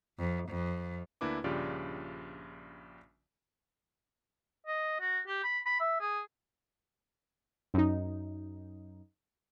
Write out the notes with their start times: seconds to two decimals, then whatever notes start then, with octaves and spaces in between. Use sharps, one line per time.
0.19 F2
0.49 F2
1.21 D2 A#3 D4 E4 B4 D6
1.44 A#1 G2 C#3 F4 G4 D5
4.67 D#5
5.00 F#4
5.27 G4
5.44 B5
5.65 B5
5.80 E5
6.00 G#4
7.74 F#2 D#4